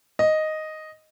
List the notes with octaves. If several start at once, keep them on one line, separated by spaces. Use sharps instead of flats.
D#5